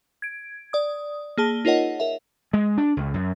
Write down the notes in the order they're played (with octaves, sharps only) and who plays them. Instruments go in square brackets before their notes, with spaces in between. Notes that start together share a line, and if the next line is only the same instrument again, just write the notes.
[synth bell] G#6 D7
D5 D#6
A#3 G#4 A5 G7
D#4 F4 A#4 C#5 D#5 F#5
A#4 E5
[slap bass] G#3
D4
C#2
F#2